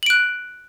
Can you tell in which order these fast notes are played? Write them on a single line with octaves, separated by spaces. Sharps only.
F#7 D7 F#6